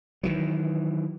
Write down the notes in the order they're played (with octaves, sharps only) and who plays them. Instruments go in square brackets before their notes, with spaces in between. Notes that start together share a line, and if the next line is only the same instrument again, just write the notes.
[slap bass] D#3 E3 F#3